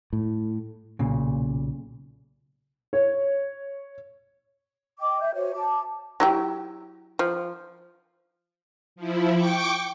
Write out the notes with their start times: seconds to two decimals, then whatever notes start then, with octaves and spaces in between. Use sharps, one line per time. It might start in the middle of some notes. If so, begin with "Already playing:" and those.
0.13 A2
0.99 B1 A#2 C#3
2.93 C#5
5.00 D#5 G5 D6
5.21 E5 G6
5.34 F#4 C5 C#5
5.55 A5 D6
6.20 F#3 E4 G4
7.19 F3
8.96 F3 E4
9.34 G5 C#6 D6